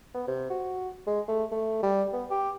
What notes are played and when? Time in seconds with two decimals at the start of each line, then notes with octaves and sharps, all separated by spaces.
0.14 B3
0.27 C3
0.50 F#4
1.07 G#3
1.28 A3
1.52 A3
1.83 G3
2.13 B3
2.31 G4